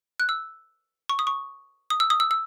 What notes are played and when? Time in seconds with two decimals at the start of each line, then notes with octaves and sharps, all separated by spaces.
0.20 F#6
0.29 E6
1.09 C#6
1.19 D#6
1.27 C#6
1.90 D#6
2.00 E6
2.10 D#6
2.20 E6
2.31 E6